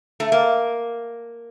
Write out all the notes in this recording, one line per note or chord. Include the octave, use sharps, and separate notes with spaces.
A3
A#3